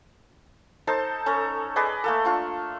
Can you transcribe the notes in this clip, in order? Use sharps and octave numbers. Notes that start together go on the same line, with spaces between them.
D#4 A4 C5 A5
C#4 A4 C#5 A#5
G#4 B4 D5 D#5
A3 A#3 A4
D4 F4 C#6